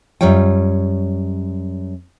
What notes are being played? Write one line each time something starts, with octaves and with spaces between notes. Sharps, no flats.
F#2 G3 F4 C#5 G5